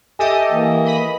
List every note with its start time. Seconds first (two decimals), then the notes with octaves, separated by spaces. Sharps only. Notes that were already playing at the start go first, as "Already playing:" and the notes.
0.19 G4 A4 D#5 E5 G#5
0.52 E3 A#3
0.85 D#5 B5